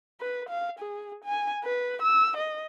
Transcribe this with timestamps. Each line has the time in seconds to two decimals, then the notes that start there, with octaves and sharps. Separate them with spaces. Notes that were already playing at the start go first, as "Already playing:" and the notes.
0.20 B4
0.49 F5
0.79 G#4
1.24 G#5
1.64 B4
2.02 E6
2.37 D#5